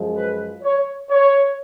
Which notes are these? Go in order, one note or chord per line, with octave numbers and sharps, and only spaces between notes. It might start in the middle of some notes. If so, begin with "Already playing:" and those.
Already playing: F#2 F3 G#3
B4
C#5
C#5